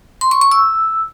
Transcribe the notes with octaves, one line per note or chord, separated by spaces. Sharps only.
C6
C#6
C#6
E6